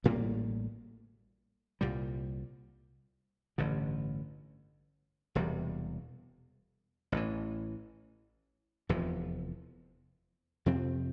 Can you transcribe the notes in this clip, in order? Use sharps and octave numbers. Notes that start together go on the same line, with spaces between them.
A1 A2 G3 A#3
C2 A#2 G3
A1 G2 D3
E1 E2 C3 G3
A1 A2 E3
F1 E2 C3 F3
F2 C3 F3 C4